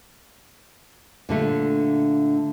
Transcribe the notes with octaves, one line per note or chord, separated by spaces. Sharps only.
A#2 D3 A3